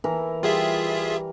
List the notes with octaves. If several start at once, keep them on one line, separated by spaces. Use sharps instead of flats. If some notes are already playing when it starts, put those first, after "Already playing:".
E3 A#4
G3 F4 G#4 E5